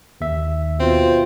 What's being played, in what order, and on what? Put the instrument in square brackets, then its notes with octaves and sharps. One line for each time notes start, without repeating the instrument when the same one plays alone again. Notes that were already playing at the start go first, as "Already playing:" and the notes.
[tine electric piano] D#2 E5
[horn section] B2 F4 [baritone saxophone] C4